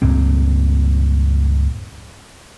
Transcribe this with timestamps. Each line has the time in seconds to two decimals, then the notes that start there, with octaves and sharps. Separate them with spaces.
0.02 C#2 G2 A#2 C4